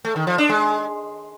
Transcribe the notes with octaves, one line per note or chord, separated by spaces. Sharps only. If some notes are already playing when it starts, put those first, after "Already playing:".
A3
D#3
F3
D4
G#3